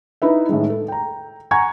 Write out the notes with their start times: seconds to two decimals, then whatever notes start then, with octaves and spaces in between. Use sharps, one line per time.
0.22 D#4 E4 B4 E5
0.49 A2 D#3 G#3
0.70 A4
0.88 G5 A#5
1.51 F#5 G#5 A#5 C#6 G#6